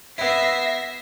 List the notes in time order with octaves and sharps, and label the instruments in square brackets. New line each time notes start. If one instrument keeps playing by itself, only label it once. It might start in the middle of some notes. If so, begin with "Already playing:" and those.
[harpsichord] B3 E4 [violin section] E5 A#6 C7